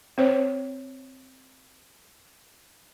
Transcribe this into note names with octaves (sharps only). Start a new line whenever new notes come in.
C4 C5 C#5